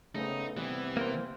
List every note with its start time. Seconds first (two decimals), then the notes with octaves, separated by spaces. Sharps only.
0.15 C#3 A3 B3 C4 D#4
0.57 C3 E3 G3 B3
0.97 A#3 A#4 C5